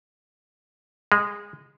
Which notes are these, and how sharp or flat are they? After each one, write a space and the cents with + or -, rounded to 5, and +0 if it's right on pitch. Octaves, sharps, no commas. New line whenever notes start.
G#3 -20